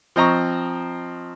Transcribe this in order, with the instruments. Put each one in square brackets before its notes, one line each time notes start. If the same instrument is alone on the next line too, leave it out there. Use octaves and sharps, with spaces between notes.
[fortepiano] F3 C4 D#5 A#5 C#6